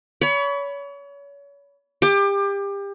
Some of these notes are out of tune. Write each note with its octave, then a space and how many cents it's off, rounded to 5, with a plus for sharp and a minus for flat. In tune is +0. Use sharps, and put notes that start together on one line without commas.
C#5 +35 B5 +0
G4 +30 D6 +25